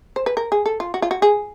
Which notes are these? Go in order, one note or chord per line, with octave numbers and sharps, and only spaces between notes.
C5
B4
A#4
G#4
A4
F4
F#4
F4
F#4
G#4